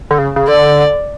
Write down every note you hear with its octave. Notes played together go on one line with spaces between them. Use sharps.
D3
C#3
C#3
D3 D5